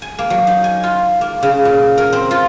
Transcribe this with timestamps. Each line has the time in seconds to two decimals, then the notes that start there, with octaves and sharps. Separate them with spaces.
0.02 G#5
0.19 A#3
0.30 F#3
0.47 D#4
0.64 G#5
0.84 F4
1.21 A#3
1.43 C#3
1.65 A#2
1.98 A#4
2.13 C4
2.31 F4